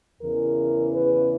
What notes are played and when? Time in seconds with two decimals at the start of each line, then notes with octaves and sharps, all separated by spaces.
0.21 E2 C#3 E3 A#4
0.95 B4